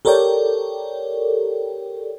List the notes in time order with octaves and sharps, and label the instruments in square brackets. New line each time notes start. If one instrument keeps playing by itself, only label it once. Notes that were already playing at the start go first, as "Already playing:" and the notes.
[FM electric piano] G4 A4 A#4 C#5 D5 G5